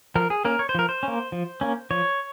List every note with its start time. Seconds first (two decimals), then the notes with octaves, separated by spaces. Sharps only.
0.15 F3 A#4
0.30 G#4
0.45 A#3 C#4 A#4
0.59 C#5
0.69 C5
0.75 F3 A#4
0.89 C5
1.03 A#3 C#4
1.32 F3
1.61 A#3 C#4
1.91 F3 C#5